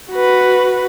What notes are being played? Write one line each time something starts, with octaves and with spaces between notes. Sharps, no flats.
F#4 B4